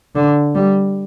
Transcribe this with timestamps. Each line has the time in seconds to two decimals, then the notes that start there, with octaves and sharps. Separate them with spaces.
0.15 D3
0.55 G3